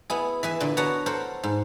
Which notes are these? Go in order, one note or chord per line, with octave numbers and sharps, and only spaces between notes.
B3 E4 G#4
E3 E5 G#5
A#2 D3
B3 F#4 C#5 F#5 A5 A#5
A4 A#4 C5 F#5
G#2